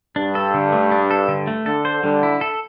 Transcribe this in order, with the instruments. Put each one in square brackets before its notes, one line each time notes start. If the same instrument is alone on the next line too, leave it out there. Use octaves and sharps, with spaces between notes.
[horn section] G2 [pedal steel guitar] D4
[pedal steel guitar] A4
D3
A3
D4
A4
D3
A3
[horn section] D3 [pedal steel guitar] A4
[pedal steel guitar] C5
[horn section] D3 [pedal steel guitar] G3
[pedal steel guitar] E4
A4